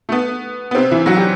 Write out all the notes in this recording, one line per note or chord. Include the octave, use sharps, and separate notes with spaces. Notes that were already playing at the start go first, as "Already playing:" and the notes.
A3
B3
B3
C3 C4
E3 E4
F#3 F#4
G3 G4